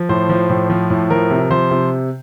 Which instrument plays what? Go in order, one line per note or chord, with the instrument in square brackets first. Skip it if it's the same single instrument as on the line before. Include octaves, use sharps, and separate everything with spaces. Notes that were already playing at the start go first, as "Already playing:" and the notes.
Already playing: [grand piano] F3
A2 C5
F3
A2
F3
A2
F3 A#4
C3
F3 C5
C3